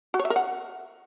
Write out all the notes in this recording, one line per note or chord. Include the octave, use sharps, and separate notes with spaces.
F#4
C#5
E5
A#4
F#5